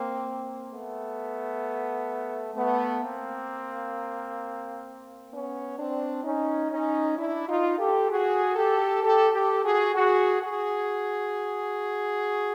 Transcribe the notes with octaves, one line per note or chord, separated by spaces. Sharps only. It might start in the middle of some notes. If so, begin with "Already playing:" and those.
Already playing: A#3 C4
A3 B3
A3 B3
A#3 C4
B3 C#4
C4 D4
C#4 D#4
C#4 D#4
D4 E4
D#4 F4
G4 A4
F#4 G#4
G4 A4
G4 A4
G4 A4
F#4 G#4
F#4 G#4
F#4 G#4